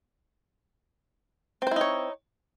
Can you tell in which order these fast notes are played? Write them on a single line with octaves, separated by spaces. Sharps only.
C4 C5 E4 D#4 C#5